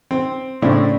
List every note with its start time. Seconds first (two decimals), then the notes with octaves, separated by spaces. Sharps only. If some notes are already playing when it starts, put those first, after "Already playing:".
0.11 C4
0.62 A2 C#3 C4 D4 E4